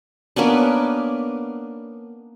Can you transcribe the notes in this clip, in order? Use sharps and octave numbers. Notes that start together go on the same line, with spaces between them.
A#3 B3 C#4 D4